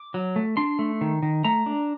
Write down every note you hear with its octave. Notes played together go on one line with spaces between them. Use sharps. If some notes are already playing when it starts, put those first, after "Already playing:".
Already playing: D6
F#3
A3
D4 C6
A3
D#3
D#3
A3 A#5
D4